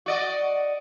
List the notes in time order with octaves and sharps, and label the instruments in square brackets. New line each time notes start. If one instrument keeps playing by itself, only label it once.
[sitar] F#4 D5 D#5